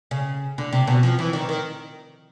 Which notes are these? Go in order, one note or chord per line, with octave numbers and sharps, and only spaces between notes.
C#3
D3
C3
B2
F3
E3
D#3
D#3